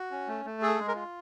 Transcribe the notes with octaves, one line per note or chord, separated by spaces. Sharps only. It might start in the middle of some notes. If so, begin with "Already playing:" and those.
Already playing: F#4
C#4
A3
A3
G#4 A4
A4
G#3
A#4
F4